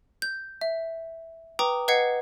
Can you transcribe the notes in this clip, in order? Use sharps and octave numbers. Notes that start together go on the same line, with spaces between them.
G6
E5
B4 G5 A#5 D6 D#6
B4 D#5 F#5 G#6 C7 C#7